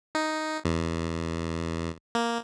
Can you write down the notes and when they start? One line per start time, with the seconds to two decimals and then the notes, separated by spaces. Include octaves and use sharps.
0.15 D#4
0.65 E2
2.15 A#3